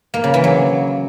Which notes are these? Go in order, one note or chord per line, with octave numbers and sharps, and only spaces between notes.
A#3
C#3
E3
F#3